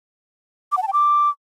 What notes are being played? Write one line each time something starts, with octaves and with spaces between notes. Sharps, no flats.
D6
F#5
A5
G5
D6